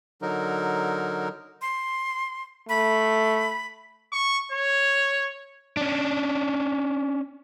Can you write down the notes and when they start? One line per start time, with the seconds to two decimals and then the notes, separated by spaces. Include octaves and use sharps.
0.22 D3 F#3 D#4 A#4
1.62 C6
2.69 A3 B5
4.12 C#6
4.52 C#5
5.77 C#4 D4